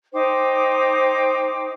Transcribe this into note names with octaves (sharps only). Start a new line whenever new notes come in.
D#4 C5 G5 D6